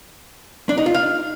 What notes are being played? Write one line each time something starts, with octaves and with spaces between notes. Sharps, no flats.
D4
D#4
F4
F5